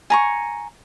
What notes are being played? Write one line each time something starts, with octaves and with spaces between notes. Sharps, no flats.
G#5 A#5 C#6